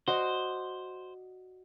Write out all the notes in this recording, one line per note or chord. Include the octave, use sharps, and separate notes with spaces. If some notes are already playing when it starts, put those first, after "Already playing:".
F#4 C5 D5 D#5